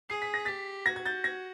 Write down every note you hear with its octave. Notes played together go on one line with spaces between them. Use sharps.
G#4 C7
B6
A#6
G4 A6 B6
F#4 G#6 A#6
G#6
G6 A6
G#6 A#6